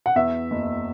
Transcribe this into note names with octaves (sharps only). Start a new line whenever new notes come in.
F#5
E2 E5
F#1